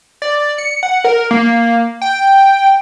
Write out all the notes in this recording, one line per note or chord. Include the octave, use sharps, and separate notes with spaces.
D5
C#7
F#5
A#4
A#3
G5